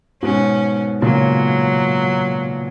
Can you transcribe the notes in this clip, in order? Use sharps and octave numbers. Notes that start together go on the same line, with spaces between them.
G#2 B2 C#4
A#2 C#3 F#3